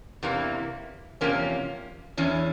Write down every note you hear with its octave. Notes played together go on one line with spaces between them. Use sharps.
E2 C3 E3 A#3
E2 C3 F3 A#3 C#4
E2 E3 C#4